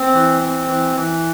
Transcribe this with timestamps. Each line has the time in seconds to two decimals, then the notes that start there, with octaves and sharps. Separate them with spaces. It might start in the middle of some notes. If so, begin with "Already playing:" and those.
Already playing: C4
0.13 E3
0.40 C4
0.68 E3
0.96 E3